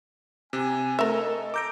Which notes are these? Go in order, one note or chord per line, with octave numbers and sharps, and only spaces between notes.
C3 G#5
A3 A4 A#4 E5
D#5
A#5 D6 G6 D7